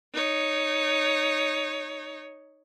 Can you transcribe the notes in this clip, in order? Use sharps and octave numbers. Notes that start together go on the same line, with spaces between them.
D#4 C#5